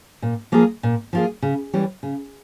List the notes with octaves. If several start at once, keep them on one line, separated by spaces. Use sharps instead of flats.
A#2
F3 A#3 F4 G#4
A#2
F3 A#3 F4 G#4
C#3
E3 G3 C#4
C#3